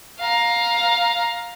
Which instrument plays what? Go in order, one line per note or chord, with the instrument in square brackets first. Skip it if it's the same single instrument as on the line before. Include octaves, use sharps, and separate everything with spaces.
[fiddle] F5 A#5